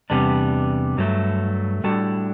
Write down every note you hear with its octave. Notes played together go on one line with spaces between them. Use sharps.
E2 C3 G3 B3 D4
G2 F#3 A3
A2 G3 D4 F#4 A4